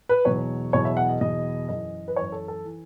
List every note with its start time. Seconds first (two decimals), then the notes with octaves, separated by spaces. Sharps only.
0.09 B4
0.25 E2 B2 F#3 C#5
0.73 E2 B2 F#3 C#5
0.85 E5
0.97 F#5
1.09 D#5
1.21 E2 B2 F#3 D#5
1.69 F#2 E3 D#5
2.08 B4
2.16 F#2 E3 C#5
2.32 A4
2.48 A4
2.65 E3